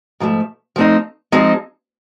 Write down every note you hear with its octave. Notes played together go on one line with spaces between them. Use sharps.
G#2 F3 A3
F3 A3 C4 D#4
F3 G#3 C4 D#4